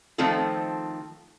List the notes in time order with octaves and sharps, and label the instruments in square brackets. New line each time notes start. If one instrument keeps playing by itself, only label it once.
[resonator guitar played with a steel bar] D#3 F3 A3 C4 F4 A4